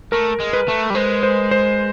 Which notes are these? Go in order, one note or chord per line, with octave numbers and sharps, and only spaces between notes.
A3 A#4
G#3
B4
A3
G3
G#3 C5
C5
C5